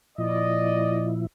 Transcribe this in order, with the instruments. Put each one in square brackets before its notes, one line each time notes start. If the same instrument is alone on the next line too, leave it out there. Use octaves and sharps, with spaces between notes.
[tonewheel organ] A#2 F3 E4 [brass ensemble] D5 D#5